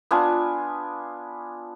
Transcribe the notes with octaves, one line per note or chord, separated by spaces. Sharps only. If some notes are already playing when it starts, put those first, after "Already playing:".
B3 D4 F4 G#5